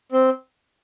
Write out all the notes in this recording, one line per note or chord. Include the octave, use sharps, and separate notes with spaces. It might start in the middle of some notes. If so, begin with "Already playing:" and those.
C4